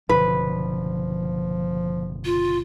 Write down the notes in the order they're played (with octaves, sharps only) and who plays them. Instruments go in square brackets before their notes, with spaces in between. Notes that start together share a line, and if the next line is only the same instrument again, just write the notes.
[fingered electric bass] F#1 B2 D3 [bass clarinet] F3 [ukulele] B4
[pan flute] F4